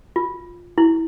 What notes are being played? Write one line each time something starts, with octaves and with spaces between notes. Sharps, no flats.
F4
E4